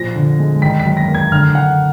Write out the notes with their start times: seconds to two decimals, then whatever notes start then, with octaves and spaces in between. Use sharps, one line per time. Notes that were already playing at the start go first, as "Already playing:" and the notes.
Already playing: A#2 F3 A#6
0.15 D3
0.39 G#3
0.62 D#3 B6
0.79 B6
0.85 F#2
0.97 A#6
1.08 A#3
1.15 G#6
1.32 D3 F6
1.55 D3 F#5